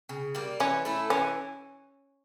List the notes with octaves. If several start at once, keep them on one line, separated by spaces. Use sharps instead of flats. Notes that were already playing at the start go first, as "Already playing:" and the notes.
C#3
G3 A#3
E3 C#4
A3 E4 A4
E3 C#4